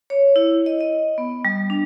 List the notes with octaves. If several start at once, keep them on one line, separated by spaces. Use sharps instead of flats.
C#5
E4
D#5
D#5
B3
G3
D4